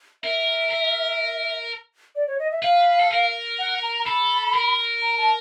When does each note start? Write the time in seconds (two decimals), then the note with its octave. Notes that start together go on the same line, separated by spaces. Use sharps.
0.23 A#4 E5
0.71 A#4
2.15 D5
2.27 C#5
2.39 D#5
2.52 E5
2.63 B4 F5
2.99 A4
3.11 A#4
3.59 F#5
3.83 A#5
4.06 A4 B5
4.54 A#4
5.02 A#5
5.18 A5